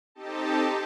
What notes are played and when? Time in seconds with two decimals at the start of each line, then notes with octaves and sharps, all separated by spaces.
0.15 C4 D#4 G4 A4 D#5 A5